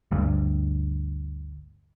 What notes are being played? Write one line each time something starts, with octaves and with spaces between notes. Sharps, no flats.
G1 D2 G2